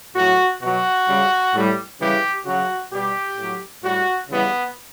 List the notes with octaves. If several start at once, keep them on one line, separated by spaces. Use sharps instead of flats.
A2 F#3 F#4
B2 F#3 F#4
C#3 G3
A2 G3
C#3 E3 G3 G4
C#3 F#3 F#4
B2 G3 G4
A2 F#3
A2 G3 F#4
C#3 E3 G3 B3